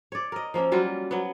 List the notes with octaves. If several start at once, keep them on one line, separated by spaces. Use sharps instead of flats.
C#5 D5
A#4 D#5
F3 A#3 C#4 E5
F#3 G3 F4 F#4
F#3 B3